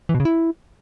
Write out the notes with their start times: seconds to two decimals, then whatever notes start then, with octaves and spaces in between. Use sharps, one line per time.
0.09 E3
0.15 B2
0.20 C#3
0.25 E4